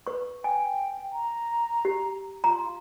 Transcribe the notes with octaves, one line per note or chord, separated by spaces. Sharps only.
B4 C#6
G5 G#5
A#5
G4
F4 A#5